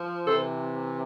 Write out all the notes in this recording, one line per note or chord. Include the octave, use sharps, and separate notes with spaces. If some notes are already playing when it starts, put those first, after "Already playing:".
Already playing: F3
C3 E3 A4 C5